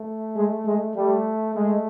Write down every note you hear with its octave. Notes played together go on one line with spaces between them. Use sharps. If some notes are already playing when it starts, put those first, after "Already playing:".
Already playing: A3
G#3
G#3
G3 A3
G#3 A3